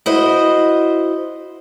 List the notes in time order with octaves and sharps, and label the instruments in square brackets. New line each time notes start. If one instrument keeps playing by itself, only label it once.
[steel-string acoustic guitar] E4 F#4 C5 D#5